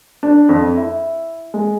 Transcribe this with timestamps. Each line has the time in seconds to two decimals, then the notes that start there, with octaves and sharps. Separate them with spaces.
0.23 D4
0.49 F2
0.77 E4
1.54 G#3